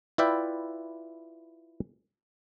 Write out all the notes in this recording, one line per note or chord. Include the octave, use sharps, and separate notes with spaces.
E4 F4 B4 D5 E5 G5